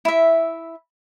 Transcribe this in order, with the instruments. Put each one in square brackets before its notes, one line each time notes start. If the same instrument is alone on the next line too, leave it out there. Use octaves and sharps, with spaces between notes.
[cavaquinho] E4 E5